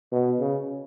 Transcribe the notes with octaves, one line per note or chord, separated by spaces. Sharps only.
B2
C#3